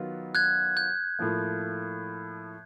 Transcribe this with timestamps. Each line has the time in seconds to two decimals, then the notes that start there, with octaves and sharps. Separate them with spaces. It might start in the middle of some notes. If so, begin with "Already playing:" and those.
Already playing: D#3 F#3 B3 F4
0.35 F#6 G#6
0.77 G6
1.19 A2 F3 A#3